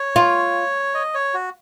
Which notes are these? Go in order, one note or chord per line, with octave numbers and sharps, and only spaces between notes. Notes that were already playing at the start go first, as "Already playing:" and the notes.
Already playing: C#5
F4
D#5
C#5
F#4